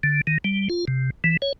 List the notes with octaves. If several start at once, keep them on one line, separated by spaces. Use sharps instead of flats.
D3
D#3
G3
F4
C3
E3
C#5